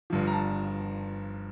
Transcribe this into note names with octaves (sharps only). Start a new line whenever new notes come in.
G1 G2 F3
A#5
A5